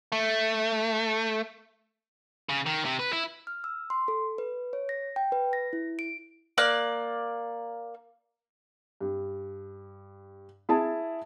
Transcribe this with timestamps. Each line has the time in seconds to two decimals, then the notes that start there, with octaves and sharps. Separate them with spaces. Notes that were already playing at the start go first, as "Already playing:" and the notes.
0.12 A3
2.49 C#3
2.66 D#3
2.85 C3
3.00 B4
3.13 E4
3.47 F6
3.64 E6
3.90 C6
4.08 A4
4.38 B4
4.73 C#5
4.89 A#6
5.16 G5
5.32 B4
5.53 A#6
5.73 E4
5.99 D7
6.58 A#3 D5 F#6
9.01 G2
10.69 E4 G#4 A5